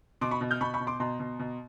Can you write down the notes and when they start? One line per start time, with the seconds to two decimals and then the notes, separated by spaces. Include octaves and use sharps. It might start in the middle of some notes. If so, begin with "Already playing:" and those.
0.21 B2 C6 D6
0.31 B5 C#6
0.41 B2
0.51 F6 G6
0.61 B2 B5 C#6
0.74 B5 C#6
0.80 B2
0.87 C6 D6
1.00 B2 A#5 C6
1.20 B2
1.39 B2